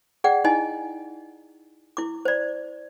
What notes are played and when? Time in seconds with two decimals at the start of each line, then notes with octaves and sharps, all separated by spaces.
0.24 G#4 D5 F#5 G5
0.44 D#4 E4 D#5 G#5
1.97 E4 D6
2.25 C5 D5